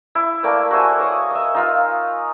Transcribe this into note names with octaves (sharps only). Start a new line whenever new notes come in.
E4
A3 A#3 D5 G5
F#4 C5 E5 G#5
C#5 D#6
D#5 E5
D#4 F4 E6